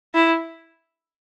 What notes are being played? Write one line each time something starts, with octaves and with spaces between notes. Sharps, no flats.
E4